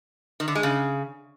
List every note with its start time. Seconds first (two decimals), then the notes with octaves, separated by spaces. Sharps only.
0.40 D#3
0.48 D3
0.55 G#3
0.63 C#3